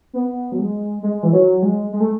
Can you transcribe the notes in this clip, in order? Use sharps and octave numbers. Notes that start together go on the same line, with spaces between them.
B3
F#3
G#3
G#3
E3
F#3
G#3
G#3
A3